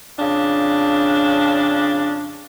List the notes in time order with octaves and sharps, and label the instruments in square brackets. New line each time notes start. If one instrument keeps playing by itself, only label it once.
[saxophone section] F2 C#3 D4